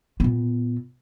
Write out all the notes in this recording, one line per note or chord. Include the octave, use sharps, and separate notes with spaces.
A#2 B3